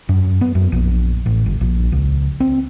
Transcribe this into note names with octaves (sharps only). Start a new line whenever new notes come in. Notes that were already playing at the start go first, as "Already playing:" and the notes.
F#2
B3
F#2
A#1
A1
G1
A#1
C#2
C4